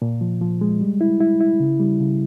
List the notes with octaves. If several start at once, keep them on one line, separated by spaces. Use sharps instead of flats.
A#2
F3
F3
G#3
G3
E4
E4
E4
C#3
G3
C#3